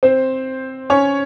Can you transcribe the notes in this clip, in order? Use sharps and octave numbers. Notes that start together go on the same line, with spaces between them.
C4 C5
C#4 C#5